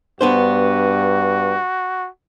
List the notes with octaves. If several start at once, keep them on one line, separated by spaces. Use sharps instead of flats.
G2 B3 D4 F#4 C5